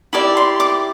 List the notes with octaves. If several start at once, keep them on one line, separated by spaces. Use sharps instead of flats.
E4 G4 D5 D6
C6
D6